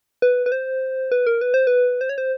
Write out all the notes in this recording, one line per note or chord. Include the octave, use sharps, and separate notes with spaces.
B4
B4
C5
B4
A#4
B4
C5
B4
C5
C#5
C5